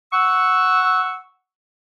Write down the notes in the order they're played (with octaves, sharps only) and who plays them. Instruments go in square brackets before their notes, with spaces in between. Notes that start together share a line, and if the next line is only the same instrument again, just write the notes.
[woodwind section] F#5 C#6 E6